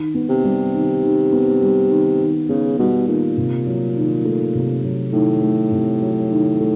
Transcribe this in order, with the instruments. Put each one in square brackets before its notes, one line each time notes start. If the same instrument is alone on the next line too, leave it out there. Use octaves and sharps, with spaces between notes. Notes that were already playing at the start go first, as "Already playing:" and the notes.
Already playing: [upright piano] D#3
B3
[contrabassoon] C3
[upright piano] G3
D#3
D#3
B3
G3
D#3
D#3
[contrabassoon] C#3 [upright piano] B3
[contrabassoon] B2 [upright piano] G3
[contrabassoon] A#2 [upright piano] D#3
[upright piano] C3
F#3
D#3
A3
C3
F#3
[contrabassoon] A2 [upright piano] D#3
[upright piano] A3
C3
F#3
D#3
A3